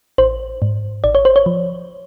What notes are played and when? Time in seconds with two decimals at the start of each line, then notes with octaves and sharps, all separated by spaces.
0.18 A1 C5
0.62 G#2
1.04 A1 D5
1.15 C#5
1.25 C5
1.36 C#5
1.46 F3